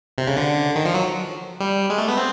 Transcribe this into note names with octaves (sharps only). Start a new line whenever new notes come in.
C3
C#3
D3
D#3
F3
F#3
G3
G#3
A3
B3
C4